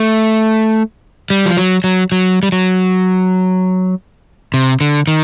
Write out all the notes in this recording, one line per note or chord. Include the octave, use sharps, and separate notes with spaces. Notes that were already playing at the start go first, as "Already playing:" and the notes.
Already playing: A3
G3
F3
F#3
F#3
F#3
G3
F#3
C3
D3
D#3